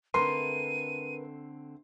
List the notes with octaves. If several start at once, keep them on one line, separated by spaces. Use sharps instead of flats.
D3 A3 C4 A#4 B4 C6 D#7